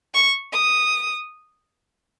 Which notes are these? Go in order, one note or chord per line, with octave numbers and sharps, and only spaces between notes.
C#6
D#6